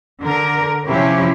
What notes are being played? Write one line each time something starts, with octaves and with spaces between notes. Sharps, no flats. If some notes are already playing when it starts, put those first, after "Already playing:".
D3 A#4
C3 F3 C#4 E4 G4